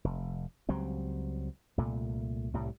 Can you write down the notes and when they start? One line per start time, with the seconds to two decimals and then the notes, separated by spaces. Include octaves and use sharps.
0.04 F1
0.69 C#2 F#3 G3 C4
1.78 C2 A#2 A3
2.54 C2 A2 G3